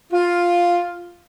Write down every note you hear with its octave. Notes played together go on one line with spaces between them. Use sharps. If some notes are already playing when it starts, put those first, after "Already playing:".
F4